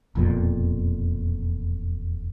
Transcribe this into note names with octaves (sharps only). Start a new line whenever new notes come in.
E1 F2 A#2